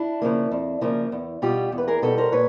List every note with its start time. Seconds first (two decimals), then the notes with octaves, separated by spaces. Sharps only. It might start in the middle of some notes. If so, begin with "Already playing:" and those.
Already playing: D4 E4
0.22 C#3 F3 A#3
0.51 F2
0.81 C#3 F3 A#3
1.12 E2
1.42 B2 G3 F4 G4
1.72 E2
1.78 B4
1.88 G#4 A#4
2.02 B2 G3 A4 B4
2.18 A#4 C5
2.32 A#2 B4 C#5